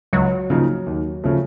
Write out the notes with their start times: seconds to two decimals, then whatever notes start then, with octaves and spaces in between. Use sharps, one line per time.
0.13 C#2 F#3
0.50 C#3 F3 A#3 D#4
0.86 D#2
1.24 C#3 F3 A3